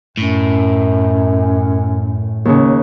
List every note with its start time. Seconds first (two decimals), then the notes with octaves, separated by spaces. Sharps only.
0.18 F#2 A2
2.45 D#2 C#3